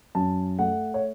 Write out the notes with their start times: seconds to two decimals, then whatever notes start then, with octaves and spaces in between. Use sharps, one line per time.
0.15 F#2 A5
0.59 A3 F#5
0.94 C#5